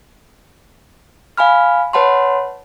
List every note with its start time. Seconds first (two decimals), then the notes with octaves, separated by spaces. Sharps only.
1.37 F5 G#5 B5 F6
1.93 B4 C#5 F#5 A5 B5 C6